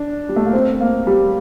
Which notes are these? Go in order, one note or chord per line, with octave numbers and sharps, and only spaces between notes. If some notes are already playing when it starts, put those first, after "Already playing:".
Already playing: D4
G3
A3
A#3
C4
A#3
G3